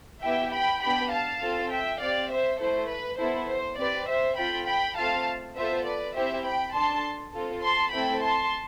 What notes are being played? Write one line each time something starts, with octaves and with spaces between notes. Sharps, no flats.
B3 E4 G4 E5 G5
G5 B5
B3 D4 G4 G5 B5
F5 A5
C4 F4 A4
E5 G5
C4 G4 D5 F5
C5 E5
A3 E4 A4 C5
B4
B3 E4 A4 C5
C5
C4 G4 B4 D5
C5 E5
C4 F4 A4 G5 B5
G5 B5
A3 C4 F4 A4 F5 A5
B3 F4 A4 C5 E5
B4 D5
C4 E4 G4 C5 E5
G5 B5
D4 A4 A5 C6
C4 F4 A4
A5 C6
A3 C4 E4 A4 G5 B5
A5 C6